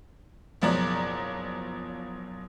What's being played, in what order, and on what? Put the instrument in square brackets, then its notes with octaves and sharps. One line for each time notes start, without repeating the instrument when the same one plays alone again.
[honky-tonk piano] F#1 B2 F3 F#3 D5 A#5